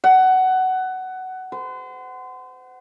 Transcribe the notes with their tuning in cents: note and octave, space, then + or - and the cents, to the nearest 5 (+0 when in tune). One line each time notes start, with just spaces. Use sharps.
F#5 +15
C5 -35